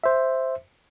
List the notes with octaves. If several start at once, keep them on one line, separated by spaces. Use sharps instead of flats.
C5 E5